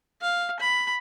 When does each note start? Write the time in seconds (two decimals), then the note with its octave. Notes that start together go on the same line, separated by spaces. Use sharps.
0.21 F5
0.60 B5